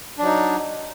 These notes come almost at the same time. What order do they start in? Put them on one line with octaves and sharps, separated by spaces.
D4 F#3 D#4